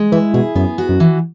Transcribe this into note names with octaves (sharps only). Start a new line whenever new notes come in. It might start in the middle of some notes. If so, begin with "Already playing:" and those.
Already playing: G#3
E3 E4
B2 G#4
F#2 B3
F#4
F#2
E3